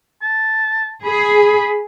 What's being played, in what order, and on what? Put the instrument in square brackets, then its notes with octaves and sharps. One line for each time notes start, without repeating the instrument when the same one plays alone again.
[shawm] A5
[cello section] G#4 [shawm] B5